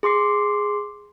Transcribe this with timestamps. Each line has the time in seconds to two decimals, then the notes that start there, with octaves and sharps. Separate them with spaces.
0.03 G#4 C6 D6 C7